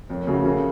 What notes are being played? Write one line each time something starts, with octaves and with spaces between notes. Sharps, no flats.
F2 A#4 C#5
C#3 A3 C#4 F#4
C#3 A#4 C#5